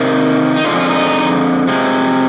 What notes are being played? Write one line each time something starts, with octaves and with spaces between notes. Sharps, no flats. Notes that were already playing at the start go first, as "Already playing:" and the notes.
Already playing: C3 D#3 A#3
D#4
F2 D3 F3 G#3 F4
F4
D#4
C3 F3 G#3